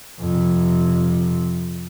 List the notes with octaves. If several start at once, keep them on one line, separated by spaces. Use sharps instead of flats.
F2 C3